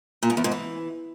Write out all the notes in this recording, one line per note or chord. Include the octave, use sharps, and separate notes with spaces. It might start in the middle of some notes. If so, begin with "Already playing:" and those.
A#2
G#2
E2
G#2
E3